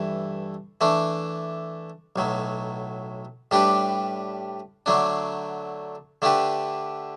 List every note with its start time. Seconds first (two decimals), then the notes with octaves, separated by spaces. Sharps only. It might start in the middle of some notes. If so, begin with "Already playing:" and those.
Already playing: G2 E3 A3 E4
0.81 E3 A3 D4
2.16 B1 A2 F#3
3.51 A2 G3 D4 G4 B4
4.86 D3 F#3 A3 D4
6.22 D3 A3 D4 G4 B4